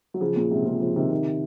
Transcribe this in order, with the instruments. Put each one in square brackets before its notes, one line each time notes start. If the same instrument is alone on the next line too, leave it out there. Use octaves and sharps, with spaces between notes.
[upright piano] F#3
C#3 F3
A#2 C#3
G#2 C3
A#2 C#3
C#3 F3
C3 D#3
C3 D#3